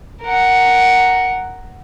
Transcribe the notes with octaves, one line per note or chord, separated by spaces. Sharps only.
A#4 F#5